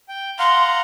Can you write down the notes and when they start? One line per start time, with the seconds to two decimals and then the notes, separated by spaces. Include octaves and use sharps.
0.08 G5
0.39 F5 F#5 A#5 C6